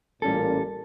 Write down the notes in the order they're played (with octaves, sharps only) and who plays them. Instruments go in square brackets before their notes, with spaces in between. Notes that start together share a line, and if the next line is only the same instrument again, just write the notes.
[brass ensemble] A1 A#2 A#4 [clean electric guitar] G3 C#4 A4